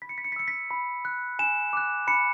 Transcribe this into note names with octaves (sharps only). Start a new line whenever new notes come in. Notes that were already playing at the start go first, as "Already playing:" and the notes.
B5 B6
C#7
B6
C#7
B6
E6 C#7
B6
B5
F#6
G#5 E7
D6 F#6
B5 C#7